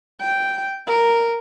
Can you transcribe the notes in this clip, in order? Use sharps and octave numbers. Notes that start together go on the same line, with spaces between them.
G5
A#4